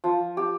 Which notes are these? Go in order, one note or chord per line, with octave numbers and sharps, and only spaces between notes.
F3
G4